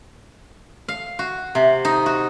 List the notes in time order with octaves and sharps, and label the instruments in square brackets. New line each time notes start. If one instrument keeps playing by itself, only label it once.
[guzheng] F5
F#4
C3
D#4
F#4